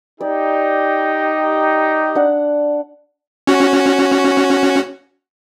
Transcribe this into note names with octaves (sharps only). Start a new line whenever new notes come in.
D#4 G4 D5
D4 F#5
C#4 F#4